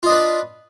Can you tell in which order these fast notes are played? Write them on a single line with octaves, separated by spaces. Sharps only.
F4 D#5 D4 B4